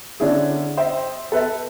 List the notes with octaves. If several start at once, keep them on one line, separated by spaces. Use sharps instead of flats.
D3 C#4 D4 E4 G#4
C5 D#5 E5 G5
A4 B4 E5